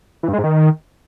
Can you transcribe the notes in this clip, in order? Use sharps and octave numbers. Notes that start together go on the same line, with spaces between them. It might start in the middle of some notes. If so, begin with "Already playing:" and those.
E3
G2
G#3
G#2
D#3